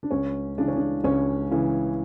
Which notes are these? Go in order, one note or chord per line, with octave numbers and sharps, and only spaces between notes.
D4
C#2 C#4
C#3 E3 D4
C#4
D4
C#2 C#4
C#3 E3